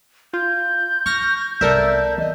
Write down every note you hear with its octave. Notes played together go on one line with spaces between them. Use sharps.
F4 G6
D#4 C#6 F6 A#6
C2 B3 A4 A#4 D5 E5
E3 B3 D#5